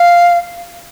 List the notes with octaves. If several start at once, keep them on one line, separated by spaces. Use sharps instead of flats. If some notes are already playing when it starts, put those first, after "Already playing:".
Already playing: F5